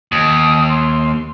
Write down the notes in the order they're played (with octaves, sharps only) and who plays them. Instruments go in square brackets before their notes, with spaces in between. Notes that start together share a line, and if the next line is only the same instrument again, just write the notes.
[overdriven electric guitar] D#2 [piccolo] D#6
[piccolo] C6